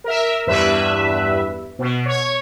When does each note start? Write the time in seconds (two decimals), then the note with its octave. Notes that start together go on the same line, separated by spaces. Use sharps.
0.04 A#4 E5
0.47 E2 G2 B4 E5
1.79 B2
2.06 C#5